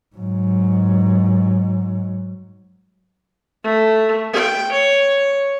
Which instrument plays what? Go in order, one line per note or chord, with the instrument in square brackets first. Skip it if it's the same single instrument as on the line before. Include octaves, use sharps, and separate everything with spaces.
[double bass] G#2 F#3
[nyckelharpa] A3
G5
C#5